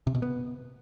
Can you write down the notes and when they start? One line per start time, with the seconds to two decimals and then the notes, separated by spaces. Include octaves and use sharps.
0.07 C3
0.15 B2
0.22 B3